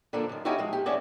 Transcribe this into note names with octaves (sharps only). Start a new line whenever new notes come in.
D3 F3 A#3 D4
F#2 D#3
C#4 D#4 E4 F#4 G4 E5
F3 G#3
G4
E2 A2 C#4 E4 F#4 D5